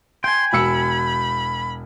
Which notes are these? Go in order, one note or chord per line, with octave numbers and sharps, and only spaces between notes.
G5 G#5 C6
E1 B5 E6 C#7